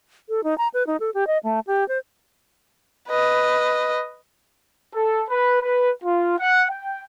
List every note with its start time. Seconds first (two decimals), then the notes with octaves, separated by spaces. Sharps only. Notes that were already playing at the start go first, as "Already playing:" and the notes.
0.29 A4
0.44 D#4
0.58 A#5
0.74 B4
0.87 D#4
1.00 A4
1.14 G4
1.27 D#5
1.43 A3
1.67 G4
1.88 C5
3.08 B4 D#5
4.94 A4
5.30 B4
5.62 B4
6.04 F4
6.39 F#5
6.71 G5